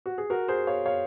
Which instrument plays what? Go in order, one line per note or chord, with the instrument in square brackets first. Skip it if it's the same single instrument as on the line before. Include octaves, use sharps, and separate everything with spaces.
[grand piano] F#4
G#4
F#4 A#4
G#4 C5
C#5 F5
C#5 F5